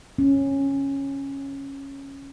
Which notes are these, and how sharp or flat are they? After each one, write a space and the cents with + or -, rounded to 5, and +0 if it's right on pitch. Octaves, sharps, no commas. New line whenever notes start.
C#4 -10